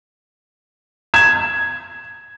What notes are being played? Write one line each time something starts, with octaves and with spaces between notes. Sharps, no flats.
G#6 E7